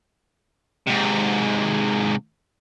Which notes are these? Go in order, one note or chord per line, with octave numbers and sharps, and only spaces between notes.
G#2 C3